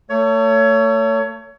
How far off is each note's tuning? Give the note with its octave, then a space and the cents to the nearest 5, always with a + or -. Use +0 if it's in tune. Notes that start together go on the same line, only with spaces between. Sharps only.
A3 +30 C#5 +25